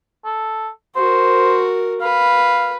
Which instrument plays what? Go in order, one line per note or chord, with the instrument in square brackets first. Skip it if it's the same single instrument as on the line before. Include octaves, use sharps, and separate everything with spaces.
[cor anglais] A4
[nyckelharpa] F#4 A#4 [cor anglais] C5
[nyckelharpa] B4 [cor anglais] F5